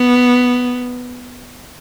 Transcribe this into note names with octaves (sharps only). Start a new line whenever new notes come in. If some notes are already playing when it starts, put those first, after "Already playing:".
Already playing: B3